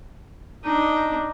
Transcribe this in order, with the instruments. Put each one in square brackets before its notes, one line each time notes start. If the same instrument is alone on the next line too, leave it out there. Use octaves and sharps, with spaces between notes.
[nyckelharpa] D4 D#4